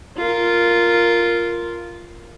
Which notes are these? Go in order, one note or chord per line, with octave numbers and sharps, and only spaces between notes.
F4 A#4